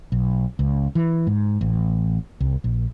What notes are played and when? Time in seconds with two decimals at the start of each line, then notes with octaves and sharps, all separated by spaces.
0.12 B1
0.59 C#2
0.95 E3
1.27 G#2
1.61 A1
2.41 C2
2.64 A#1